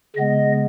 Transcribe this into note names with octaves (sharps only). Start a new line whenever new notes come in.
C#3 G#3 B3 D#5